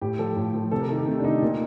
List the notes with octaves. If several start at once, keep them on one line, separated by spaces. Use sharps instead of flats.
A2 G4
F3 A4
A2
F3
C3 A4
A#4
D#3 A4
G4
C3 A3
D4
D#3 D#4
A#2